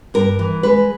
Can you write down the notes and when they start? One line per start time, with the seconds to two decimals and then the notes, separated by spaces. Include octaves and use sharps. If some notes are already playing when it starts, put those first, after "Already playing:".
0.14 G2 A#4
0.39 E3
0.63 G#3 B4